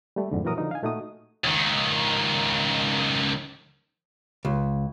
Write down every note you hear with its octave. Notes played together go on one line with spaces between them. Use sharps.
G3 A3
F2 G#2 D3
A#2 E3 F#3 F#4 A#4 D#6
D3 F3 D#4
F5 G#5
A#2 A3 D#4 F#4 D#6
C#2 D#3
C#2